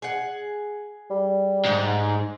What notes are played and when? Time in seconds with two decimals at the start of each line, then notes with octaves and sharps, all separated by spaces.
0.02 G#4 F#5
1.10 G3
1.65 G#2